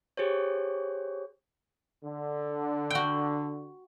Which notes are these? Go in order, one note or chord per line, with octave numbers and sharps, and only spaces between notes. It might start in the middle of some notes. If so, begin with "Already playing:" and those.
G4 G#4 C5 C#5
D3
F#4 G5